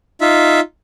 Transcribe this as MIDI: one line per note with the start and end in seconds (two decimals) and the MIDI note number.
0.21 0.60 63
0.21 0.60 65
0.21 0.60 76